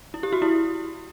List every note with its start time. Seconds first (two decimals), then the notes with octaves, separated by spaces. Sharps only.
0.14 E4
0.23 G4
0.32 F#4
0.42 E4